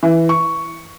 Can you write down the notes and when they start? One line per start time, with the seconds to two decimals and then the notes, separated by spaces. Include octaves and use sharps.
0.03 E3
0.29 C#6